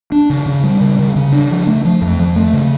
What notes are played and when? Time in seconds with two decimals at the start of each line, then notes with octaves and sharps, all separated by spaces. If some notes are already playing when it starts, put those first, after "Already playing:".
0.12 D4
0.30 C#3
0.46 C#3
0.64 G3
0.81 C#3
0.99 C#3
1.16 C#3
1.32 D4
1.51 F3
1.67 A3
1.85 F3
2.02 F2
2.19 F3
2.36 A3
2.53 C#3